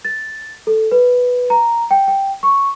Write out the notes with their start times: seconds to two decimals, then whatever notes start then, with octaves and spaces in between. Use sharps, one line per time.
0.05 A6
0.67 A4
0.92 B4
1.50 A#5
1.91 G5
2.08 G5
2.43 C#6